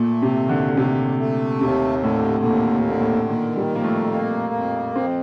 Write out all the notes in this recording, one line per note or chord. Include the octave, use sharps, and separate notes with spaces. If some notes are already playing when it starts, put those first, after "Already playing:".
Already playing: A#2 A3
C3
D#2
D3
C3 A3
A3
D#2 C3
A2 D3
A#2
D#2 A2
A#2
D3
A2
A#2 D#3
G3
F2
A#3
A3
A#3
F2
F2 C4